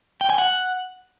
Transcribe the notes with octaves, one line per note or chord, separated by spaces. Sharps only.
G5
G#5
F#5